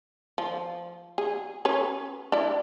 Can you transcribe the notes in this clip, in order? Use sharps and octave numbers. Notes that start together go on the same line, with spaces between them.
F3
G#4
C#4 B4 C#5
D4 E4